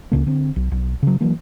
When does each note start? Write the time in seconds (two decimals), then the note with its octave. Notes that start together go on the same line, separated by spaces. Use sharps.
0.12 C#2 C#3 A#3
0.27 D3 C4
0.56 B1
0.72 B1
1.03 C#3 F#3
1.21 E3 F#3 A#3